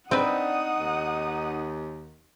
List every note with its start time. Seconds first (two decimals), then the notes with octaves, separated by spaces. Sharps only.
0.11 C4 D4 D#4 B4 F#5 D#6
0.80 D#2